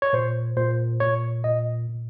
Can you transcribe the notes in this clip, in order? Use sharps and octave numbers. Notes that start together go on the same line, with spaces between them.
C#5
A#2 C5
A#2 C5
A#2 C#5
A#2 D#5
A#2